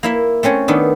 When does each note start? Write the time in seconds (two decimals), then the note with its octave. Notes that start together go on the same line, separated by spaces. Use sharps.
0.03 A#3 E4 E5
0.43 A3 C4 C#4 C#5
0.68 D#3 B3 D4 A4